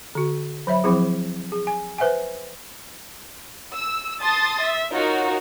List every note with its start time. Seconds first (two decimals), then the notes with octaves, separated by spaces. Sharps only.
0.15 D3 F#4
0.67 F#3 C#5 E5 B5
0.84 F3 F#3 C4 E4 G#4
1.52 G#4
1.67 G#5
1.98 B4 C5 E5 F#5 G#5
3.73 E6
4.22 A5 C6 D#6 A6
4.62 E5
4.94 D#4 F4 F#4 A#4 C#5